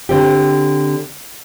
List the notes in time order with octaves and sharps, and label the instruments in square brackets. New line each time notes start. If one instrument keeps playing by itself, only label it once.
[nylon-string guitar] D3 C4 G4